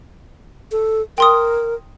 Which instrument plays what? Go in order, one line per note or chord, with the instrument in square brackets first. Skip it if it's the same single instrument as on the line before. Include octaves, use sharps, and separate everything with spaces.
[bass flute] A4
[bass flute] A#4 [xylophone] G5 C6 D#6